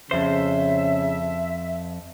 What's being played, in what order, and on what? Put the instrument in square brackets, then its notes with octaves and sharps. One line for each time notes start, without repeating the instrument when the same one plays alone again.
[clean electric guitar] F2 C5 [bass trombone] C#3 [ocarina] E5